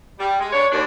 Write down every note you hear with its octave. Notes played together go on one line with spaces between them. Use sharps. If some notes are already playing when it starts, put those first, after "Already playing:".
G3
G#3
D4 B4 C#5
D#2 D4